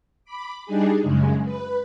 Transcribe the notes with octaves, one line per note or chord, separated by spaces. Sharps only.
B5 D6
G3 D4 D#4 G#4
F#2 C#3 G#3
B4